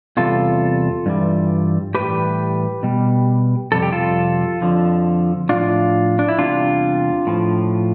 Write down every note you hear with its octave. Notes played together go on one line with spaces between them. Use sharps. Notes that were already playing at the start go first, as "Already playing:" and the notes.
E2 C3 G3 F4 A4
G2 E3 G3
A2 E3 G3 G4 B4
B2 G3
F2 C3 G3 A4
G4
F4 A4
F2 D3 F3
A2 F3 D4 F4
D4
E4
E2 C3 G3 D4 F4
A2 F3